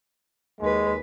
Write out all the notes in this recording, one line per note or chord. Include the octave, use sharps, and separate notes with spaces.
D#2 G#3 B4